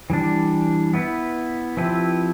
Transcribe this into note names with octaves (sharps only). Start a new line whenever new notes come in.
E3 G3 D4
B3 E4 B4
F3 C4 E4 G4 B4